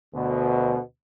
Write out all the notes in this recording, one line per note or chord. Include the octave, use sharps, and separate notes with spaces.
D2 B2